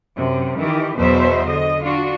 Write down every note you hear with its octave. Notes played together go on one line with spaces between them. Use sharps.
F#2 C3
D#3 E3 G4
E2 B2 F#3 C5 E5
D3 D#5
D4 F4 F#4